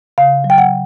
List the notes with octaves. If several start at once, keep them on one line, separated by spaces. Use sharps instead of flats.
C#3 F5
F#3
G5
F#5